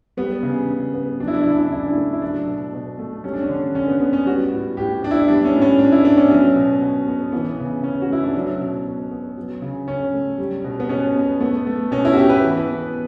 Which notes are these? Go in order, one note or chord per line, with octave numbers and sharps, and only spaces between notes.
G3 B3
C#3
C#3
B3
F#3 D4
E4
D4
E4
C#3 D4
E4
D4
C#3 E4
D4
E4
A3 D4
E4
F#3 D4
B2
B2
A3
G3 C#4
D4
C#4
D3
D3 C#4
B3
B3
C#4
G3 F#4
A2
A2 G4
B3 D4
E4
G3 D4
C#4
A2
C#4
A2 D4
E4
B3 D4
C#4
F#3 C#4
B2
B2
B3
E3 B3
C#3
C#3 C#4
F#4
A3 E4
D4
F#3 C#4
B2
B2
B3
F#3
C#3
C#3 C#4
A3
G3
B2
B3
B2 C#4
B3
A3 B3
A3
B2 C#4
E4
F#4
B2 G4
B4
E3
B3